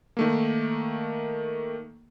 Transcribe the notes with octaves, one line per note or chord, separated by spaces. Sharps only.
D#3 A3 A#3